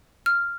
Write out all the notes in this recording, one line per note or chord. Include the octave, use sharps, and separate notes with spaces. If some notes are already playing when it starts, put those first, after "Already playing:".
F6